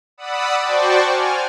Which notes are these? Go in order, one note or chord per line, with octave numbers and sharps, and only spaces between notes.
D5 F#5 B5 D#6 E6
F#4 C5 D5 G5 A5 C#6
G#5 F6